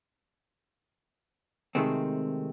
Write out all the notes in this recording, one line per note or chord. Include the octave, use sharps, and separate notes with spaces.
C3 D#3 G#3 A3 C4